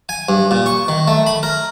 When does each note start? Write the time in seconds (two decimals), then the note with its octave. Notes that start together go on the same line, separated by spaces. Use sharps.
0.09 G#5
0.29 G2
0.51 A#2
0.66 C#6
0.88 D#3
1.08 A3
1.26 B5
1.43 A#4